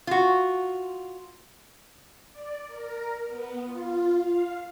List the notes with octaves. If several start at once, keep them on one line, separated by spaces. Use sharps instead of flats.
F4 F#4
D5
A#4
B3
F4
F5